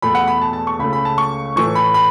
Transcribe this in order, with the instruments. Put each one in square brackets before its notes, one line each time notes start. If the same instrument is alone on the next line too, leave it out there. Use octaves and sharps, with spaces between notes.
[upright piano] E2 B2 A3 B5
F#5
B5
A5
A5
C#6
C#2 C#3 A3 B5
B5
A5
C#6
A2 E3 A3 C#6
B5
B5